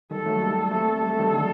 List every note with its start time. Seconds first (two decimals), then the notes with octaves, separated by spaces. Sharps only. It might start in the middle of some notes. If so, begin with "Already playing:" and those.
0.11 D#3 G3 A4
0.26 F#3 A3
0.41 G3 A#3
0.71 A3 C4 A4
1.01 G3 A4
1.10 A3
1.19 D#3 G3
1.32 D3 F#3